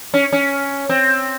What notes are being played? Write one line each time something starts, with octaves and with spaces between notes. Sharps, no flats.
C#4
C#4
C4